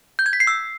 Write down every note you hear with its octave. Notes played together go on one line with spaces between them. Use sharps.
G6
G#6
B6
C7
E6